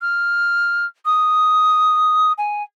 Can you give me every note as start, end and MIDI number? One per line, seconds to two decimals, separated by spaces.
0.01 0.85 89
1.05 2.32 87
2.38 2.63 80